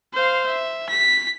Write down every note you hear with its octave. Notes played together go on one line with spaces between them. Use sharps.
C5 F5
E5
B6